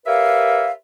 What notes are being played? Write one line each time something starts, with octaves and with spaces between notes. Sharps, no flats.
G4 A#4 B4 C#5 E5 F5